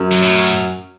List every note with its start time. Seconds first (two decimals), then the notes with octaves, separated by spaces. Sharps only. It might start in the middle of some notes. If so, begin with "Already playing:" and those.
Already playing: F#2
0.12 F#3
0.23 A2